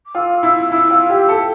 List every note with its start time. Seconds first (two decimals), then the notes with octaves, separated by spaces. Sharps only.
0.05 D6
0.15 F4 E6
0.43 E4 E6
0.71 E4 E6
0.91 F4
1.10 G4
1.29 A4